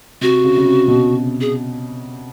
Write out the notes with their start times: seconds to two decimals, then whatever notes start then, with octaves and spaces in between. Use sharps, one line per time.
0.21 C3 F#4
0.44 C#3
0.58 C#3
0.66 C3
0.88 B2
1.41 G#4